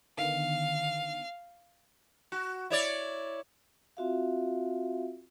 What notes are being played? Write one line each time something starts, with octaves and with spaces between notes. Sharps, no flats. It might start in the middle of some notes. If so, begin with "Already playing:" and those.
D3 D#3 B3 F5
F#4
E4 C#5 D5
C4 F4 F#4 E5 F5